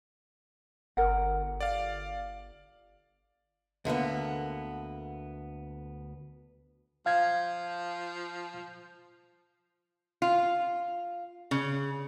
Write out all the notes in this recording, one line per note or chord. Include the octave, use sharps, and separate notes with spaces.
G1 A#4 F#5
D5 F5
D2 D3 A#3 B3
F3 F5 G#6
F4
C#3